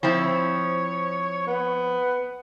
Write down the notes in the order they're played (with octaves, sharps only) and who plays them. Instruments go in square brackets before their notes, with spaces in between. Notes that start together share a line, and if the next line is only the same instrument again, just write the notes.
[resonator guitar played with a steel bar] F3 C4 E4 [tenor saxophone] C#5
[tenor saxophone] B3